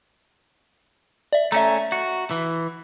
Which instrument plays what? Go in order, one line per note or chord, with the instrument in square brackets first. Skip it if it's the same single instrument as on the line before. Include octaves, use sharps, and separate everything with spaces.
[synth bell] D5 E5
[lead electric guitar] A3 C#4 [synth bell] E5 A#5
[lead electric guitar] F#4
E3